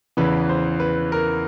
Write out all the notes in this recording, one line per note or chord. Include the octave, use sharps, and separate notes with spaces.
E2 C#3 E3 B4
C5
B4
A#4